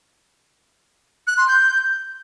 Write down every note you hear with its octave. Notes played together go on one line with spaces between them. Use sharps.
F#6
C6
G6